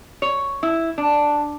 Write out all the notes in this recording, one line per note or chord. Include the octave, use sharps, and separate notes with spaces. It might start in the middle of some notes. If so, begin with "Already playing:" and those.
C#5
E4
D4